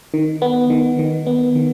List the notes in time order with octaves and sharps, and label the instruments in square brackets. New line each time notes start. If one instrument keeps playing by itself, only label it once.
[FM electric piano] D#3
B3
D#3
D#3
B3
D#3